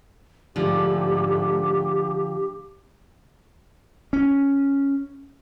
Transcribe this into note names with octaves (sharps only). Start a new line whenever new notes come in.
G#2 D3 F3 A3 G4
C#4